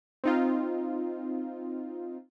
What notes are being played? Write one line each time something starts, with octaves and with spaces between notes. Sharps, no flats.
C4 D#4 F4